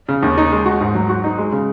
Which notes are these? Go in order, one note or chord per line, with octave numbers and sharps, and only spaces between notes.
C#3
D#2
D#4
G#3
F#4
G#2
F#3
F#4
D#4
G#3
C#3